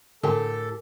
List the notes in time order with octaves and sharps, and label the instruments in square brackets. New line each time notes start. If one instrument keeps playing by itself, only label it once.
[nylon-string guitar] A2 G4 A5 [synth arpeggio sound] D3 [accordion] A4 [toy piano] A#4 G#5 C6